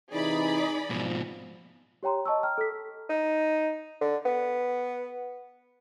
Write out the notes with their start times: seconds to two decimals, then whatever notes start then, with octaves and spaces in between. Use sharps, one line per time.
0.12 C3 E3 D#4 G#4 D5 B5
0.90 G#2 B2 F3
2.03 G4 C#5 G5 A#5 C6
2.26 D#5 A5 C#6 E6
2.43 G5 A#5 F6
2.58 A4 B6
3.09 D#4
4.01 D3
4.25 B3